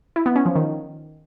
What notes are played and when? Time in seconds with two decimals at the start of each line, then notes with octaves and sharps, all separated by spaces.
0.16 E4
0.26 B3
0.36 C#4
0.46 F3
0.56 D#3